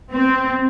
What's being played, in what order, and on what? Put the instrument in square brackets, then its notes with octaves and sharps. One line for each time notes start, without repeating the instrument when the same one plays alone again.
[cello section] C4